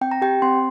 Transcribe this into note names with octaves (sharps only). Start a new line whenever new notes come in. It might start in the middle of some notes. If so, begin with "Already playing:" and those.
C4 G5
A#5
G4 G5
C4 C6